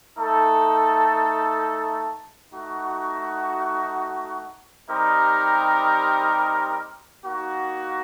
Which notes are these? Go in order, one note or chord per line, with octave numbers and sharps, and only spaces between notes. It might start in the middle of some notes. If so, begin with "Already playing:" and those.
A3 D#4 A4
A3 D#4 F#4
G3 C4 D#4 G4 A#4
A#3 D#4 F#4